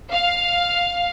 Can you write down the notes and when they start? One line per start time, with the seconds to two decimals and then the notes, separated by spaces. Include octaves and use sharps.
0.12 F5